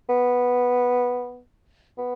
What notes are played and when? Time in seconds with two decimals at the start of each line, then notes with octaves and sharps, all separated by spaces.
0.09 B3
1.99 B3